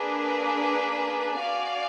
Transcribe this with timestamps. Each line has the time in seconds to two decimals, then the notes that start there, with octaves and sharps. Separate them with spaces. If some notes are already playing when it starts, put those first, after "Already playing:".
Already playing: A#3 D4 G#4 B4
1.39 F#4 D5 F5 G#5